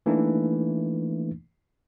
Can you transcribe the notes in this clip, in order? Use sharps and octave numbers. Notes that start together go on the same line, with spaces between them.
E3 A3 A#3 D4 D#4